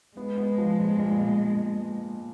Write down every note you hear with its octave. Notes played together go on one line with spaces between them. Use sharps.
G#3 B3
B3
F3
A#2
A#2